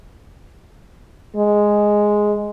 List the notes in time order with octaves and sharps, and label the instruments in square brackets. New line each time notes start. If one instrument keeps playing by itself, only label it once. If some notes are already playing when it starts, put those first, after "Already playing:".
[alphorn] G#3